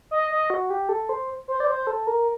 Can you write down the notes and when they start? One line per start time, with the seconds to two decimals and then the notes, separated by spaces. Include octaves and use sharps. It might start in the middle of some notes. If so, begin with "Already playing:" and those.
0.11 D#5
0.31 D#5
0.50 F#4
0.70 G4
0.89 A4
1.09 C5
1.48 C5
1.60 D5
1.68 C5
1.87 A4
2.07 A#4